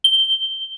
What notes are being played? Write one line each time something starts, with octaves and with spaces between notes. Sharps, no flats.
G7